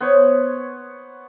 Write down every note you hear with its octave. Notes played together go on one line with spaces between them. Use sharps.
B3 C5 C#5